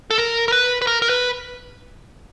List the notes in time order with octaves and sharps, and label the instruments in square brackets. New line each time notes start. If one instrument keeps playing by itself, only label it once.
[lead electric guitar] A4
A#4
A#4
B4
B4
A#4
A#4
B4